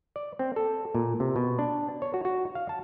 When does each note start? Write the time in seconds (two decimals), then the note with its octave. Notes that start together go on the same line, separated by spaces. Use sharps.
0.16 D5
0.39 C4
0.56 A4
0.95 A#2
1.20 C3
1.36 B2
1.59 D4
2.02 C#5
2.14 F#4
2.25 F#4
2.55 F5
2.69 A5